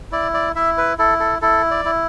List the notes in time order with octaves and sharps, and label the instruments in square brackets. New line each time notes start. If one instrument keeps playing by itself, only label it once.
[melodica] E4 D5
D5
E4 E5
B4
E4 A4
A4
E4 A4
D5
E4